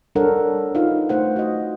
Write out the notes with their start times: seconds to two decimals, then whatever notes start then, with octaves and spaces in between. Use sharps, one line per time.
0.15 G3 D4 A4 A#4 C#5 F#5
0.75 D#4 F4 B4 F5
1.09 A3 C5 F#5
1.36 F#4 D#5